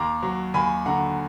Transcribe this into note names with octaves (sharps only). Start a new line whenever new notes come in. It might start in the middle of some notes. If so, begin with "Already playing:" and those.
Already playing: D#2 A#5 D6
F#3
D#2 G#5 B5
D3 F#5 A#5